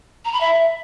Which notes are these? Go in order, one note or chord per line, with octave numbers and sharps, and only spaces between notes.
A#5
B5
E5